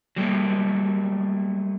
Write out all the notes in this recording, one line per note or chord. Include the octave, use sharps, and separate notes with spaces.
F#3 G3 A3 A#3